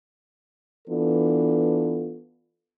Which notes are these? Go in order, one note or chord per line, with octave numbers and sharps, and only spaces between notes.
E3 B3 D4 F4 A4